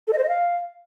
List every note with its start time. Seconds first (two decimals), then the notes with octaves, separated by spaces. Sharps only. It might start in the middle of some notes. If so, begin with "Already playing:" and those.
0.08 A4
0.13 D#5
0.18 C5
0.23 D#5
0.29 F5